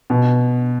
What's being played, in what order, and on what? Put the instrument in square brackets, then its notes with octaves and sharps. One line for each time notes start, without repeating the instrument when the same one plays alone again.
[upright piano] B2